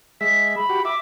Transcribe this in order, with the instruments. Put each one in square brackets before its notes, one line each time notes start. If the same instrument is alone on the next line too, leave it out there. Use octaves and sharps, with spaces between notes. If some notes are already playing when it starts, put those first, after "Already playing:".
[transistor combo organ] G#3 E5 [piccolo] B6
[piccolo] B5
[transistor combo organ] F#4 G4
[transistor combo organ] E5 [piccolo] D6